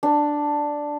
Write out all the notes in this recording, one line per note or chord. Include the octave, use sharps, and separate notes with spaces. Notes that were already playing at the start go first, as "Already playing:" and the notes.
D4